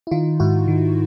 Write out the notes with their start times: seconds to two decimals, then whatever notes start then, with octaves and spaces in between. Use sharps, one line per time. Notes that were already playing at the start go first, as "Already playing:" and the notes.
0.07 E4
0.11 D#3 D#4 F4
0.40 G#2 E4 F#4
0.68 D#3